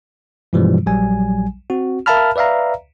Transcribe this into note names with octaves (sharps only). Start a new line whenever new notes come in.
G2 B2 E3 F3 G3 G#3
A#1 F#3 G3 G#5
C4 F#4
A#4 E5 F5 A5 B5 F6
B4 D5 E5 F5 A#5